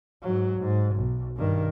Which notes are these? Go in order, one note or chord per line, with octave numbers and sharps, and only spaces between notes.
G#2 F#3
G#2
B1
G2 D#3